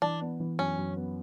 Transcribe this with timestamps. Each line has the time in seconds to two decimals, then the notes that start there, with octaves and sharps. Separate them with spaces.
0.02 E3 D4
0.21 B3
0.40 E3
0.59 F#2 C#4
0.77 F#2
0.97 B3